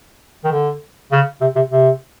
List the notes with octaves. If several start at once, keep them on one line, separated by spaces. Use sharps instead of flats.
D#3
D3
C#3
C3
C3
C3